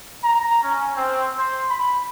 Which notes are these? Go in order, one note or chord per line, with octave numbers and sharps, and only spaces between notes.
A#5
C#4
C4
C5
B5